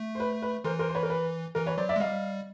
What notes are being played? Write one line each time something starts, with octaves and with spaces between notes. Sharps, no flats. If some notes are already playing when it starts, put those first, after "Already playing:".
Already playing: A3
C5
B4
B4
E3 A#4 C5
A#4 C5
C5
B4 C#5
A#4
B4
E3 A#4
B4 C#5
F#3 C5 D5
D5 E5
G#3
G3 D#5 F5